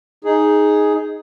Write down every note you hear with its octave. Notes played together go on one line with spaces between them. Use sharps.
D#4 G#4